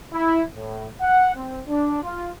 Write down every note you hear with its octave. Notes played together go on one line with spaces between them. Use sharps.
E4
A2
F#5
C4
D4
F4